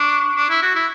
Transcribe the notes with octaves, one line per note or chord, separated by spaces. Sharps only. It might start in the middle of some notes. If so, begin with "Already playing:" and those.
Already playing: D4 C#6
D4
E4
F#4
E4